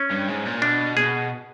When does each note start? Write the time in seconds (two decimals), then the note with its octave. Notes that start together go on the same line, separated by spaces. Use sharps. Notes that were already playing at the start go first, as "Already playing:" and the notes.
Already playing: C#4
0.11 G2
0.28 G#2
0.45 A#2
0.62 B2 D4
0.97 B2 G#4